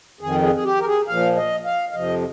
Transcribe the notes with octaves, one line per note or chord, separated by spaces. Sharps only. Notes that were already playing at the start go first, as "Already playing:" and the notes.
F2 D#3 G#4
G#4
G#4
G4
A#4
G#4
A#2 F3 F5
D#5
F5
F5
F2 C3 F3 D#5